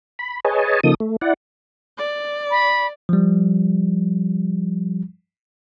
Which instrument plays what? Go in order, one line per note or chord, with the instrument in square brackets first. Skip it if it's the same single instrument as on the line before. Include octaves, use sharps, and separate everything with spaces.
[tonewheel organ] B5
G#4 B4 C#5 D#5 G#5 A5
C#3 F3 A#3 D#4 A4 D#6
A3
E4 D5 F#5
[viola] D5
[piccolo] B5
[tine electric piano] F3 G3